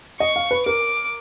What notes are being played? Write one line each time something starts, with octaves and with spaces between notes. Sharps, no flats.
D#5 C#6
F5
B4
A#4 D6